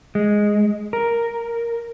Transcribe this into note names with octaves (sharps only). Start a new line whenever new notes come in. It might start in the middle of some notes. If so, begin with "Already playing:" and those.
G#3
A#4